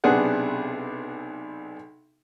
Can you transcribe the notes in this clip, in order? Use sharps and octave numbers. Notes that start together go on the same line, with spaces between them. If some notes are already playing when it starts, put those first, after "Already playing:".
B1 C3 B3 D4 G#4 F#5